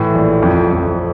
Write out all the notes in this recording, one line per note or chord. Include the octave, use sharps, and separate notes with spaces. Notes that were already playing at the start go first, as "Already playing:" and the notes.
Already playing: A2 E3
A#1
F2
F2